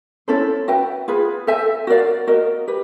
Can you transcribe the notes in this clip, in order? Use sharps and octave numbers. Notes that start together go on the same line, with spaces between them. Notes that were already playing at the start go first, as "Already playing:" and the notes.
C#4 E4 A4 C5
F#4 B4 E5 G5
F4 G#4 B4
A4 C5 E5 G#5
F#4 A#4 D5 F5
F#4 A#4 D#5
G4 B4